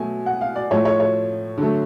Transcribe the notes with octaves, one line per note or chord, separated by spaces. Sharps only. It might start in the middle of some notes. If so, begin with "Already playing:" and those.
Already playing: B2 F#3 A3 G#5
F#5
F5
D5
A2 F3 A3 C#5
C#5
C#5
D3 F#3 A3